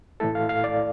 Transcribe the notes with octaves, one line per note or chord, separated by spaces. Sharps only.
A2 E3 A3 E4 A4
F5
F5
D5